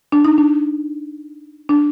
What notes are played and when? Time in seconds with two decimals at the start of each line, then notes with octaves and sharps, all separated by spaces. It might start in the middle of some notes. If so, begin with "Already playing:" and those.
0.12 D4
0.25 D#4
0.38 D4
1.69 D4